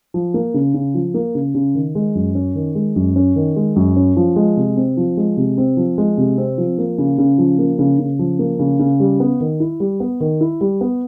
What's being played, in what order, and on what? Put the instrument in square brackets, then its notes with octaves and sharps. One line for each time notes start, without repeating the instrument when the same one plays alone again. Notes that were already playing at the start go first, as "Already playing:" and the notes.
[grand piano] F3
A#3
C#3
C#3
F3
A#3
C#3
C#3
D#3
G#3
F#2
C#4
D#3
G#3
F#2
C#4
D#3
G#3
F#2
C#4
F3
G#3
C3
C4
F3
G#3
C3
C4
F3
G#3
C3
C4
F3
A#3
C#3
C#3
F3
A#3
C#3
C#3
F3
A#3
C#3
C#3
G3
B3
D#3
E4
G3
B3
D#3
E4
G3
B3